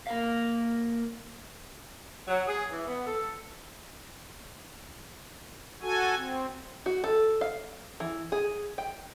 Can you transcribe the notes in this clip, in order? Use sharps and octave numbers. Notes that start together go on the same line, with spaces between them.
A#3 A#4 F5
F#3
G#4
E3
B3
A4
F#4 A4 G#5
C4
F#4
A4
F5
E3
G#4
G5